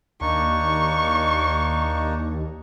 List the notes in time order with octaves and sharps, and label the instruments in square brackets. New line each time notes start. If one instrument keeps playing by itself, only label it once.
[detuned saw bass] D#2 [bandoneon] A#3 D4 D#4 [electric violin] C#6